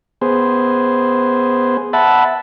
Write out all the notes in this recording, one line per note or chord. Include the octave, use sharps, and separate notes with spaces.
B3 G#4 C5
E5 F#5 A5 B5